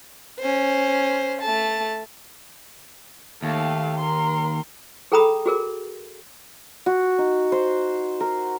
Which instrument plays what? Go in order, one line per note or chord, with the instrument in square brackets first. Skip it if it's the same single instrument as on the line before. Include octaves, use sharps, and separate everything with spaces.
[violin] C#4 C5
A3 A5
[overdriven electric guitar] D#2 [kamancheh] A3 F5
[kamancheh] A#4 C6
[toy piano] G#4 A4 G5 A#5 B5 D#6
F#4 G#4 A#4
[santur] F#4
D#4
C5
A#4